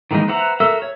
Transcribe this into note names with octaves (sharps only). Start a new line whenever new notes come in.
D#3 E3 G#3 A#3 D#4
B4 C5 E5 F#5 A#5
F#4 A4 A#4 E5 E6
C#5